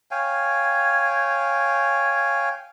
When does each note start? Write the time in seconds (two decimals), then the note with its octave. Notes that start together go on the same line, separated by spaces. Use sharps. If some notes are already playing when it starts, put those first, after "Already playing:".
0.11 C#5 F5 G5 G#5